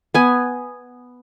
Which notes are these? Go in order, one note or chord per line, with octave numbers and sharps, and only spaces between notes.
B3 G#5